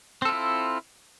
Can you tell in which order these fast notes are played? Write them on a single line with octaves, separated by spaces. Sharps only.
C4 A4 F4 E4